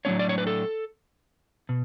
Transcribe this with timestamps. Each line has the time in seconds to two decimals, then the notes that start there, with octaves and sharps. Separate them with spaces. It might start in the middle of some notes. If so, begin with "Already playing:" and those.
0.05 A2 F#3 B3 D4 C#5
0.19 D5
0.29 C#5
0.38 B4
0.47 A4
1.69 B2